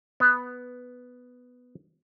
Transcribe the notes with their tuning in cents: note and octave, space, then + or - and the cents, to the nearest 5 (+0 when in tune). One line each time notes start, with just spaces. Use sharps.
B3 +5